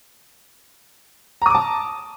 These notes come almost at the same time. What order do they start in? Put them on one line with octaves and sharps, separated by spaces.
A#5 D#6 D6 A5